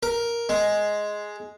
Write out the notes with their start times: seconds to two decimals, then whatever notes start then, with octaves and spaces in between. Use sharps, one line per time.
0.03 A#4
0.49 G#3